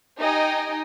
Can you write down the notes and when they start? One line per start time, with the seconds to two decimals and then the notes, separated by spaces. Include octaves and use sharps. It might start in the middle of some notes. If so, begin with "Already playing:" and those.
0.19 D#4 G4 D#5 G5 G#5